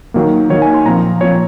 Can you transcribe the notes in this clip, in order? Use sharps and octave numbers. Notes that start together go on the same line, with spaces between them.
D#3 F#3 A#3
D#3 F#3 A#3 C#5
G#5
C6
A#2 F3 C4 A#5
A#2 F3 C4 C#5